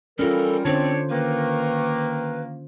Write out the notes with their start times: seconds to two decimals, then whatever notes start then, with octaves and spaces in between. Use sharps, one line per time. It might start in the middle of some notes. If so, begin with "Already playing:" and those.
0.19 E3 G3 C#4 F4 A4 A#4
0.65 D3 C4 D4 C5 C#5
1.10 D#3 A#3 B4